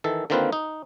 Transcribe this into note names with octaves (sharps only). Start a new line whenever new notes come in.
D#3 E3 A4
D3 D#3 A#3 C4 F4 B4
D#4